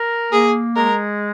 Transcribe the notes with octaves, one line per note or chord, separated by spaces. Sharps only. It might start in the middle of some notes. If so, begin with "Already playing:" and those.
Already playing: A#4
A#3 G#4
G#3 A#4